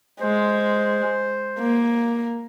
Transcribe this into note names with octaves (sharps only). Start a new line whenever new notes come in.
G#3 C5
A#3